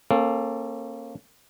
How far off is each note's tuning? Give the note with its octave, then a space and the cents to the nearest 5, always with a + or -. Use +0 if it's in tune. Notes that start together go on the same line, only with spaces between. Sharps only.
A#3 -10 C#4 -40 A4 +0